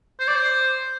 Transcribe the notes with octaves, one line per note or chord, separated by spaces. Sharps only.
C5
D5
C5